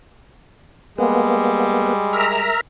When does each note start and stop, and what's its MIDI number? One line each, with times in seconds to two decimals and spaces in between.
0.98 2.51 55
0.98 2.51 56
0.98 1.93 58
0.98 1.93 59
2.13 2.61 70
2.13 2.61 76
2.13 2.61 82